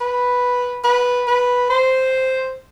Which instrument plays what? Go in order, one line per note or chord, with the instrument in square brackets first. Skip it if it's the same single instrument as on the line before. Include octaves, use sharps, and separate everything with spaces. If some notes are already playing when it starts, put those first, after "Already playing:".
[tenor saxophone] B4
B4
B4
C5